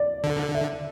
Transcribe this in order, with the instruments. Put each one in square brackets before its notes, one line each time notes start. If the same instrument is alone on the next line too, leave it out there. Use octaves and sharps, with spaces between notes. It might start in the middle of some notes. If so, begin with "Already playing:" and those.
Already playing: [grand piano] D5
[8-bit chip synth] D3
[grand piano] E5